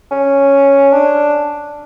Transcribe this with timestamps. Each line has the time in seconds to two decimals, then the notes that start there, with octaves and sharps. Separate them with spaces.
0.11 C#4
0.93 D4